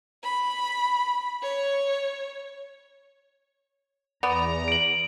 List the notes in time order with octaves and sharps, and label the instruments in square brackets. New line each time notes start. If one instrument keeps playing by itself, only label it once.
[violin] B5
C#5
[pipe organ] E2 A#5 [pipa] B3 D5
[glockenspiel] D7 F#7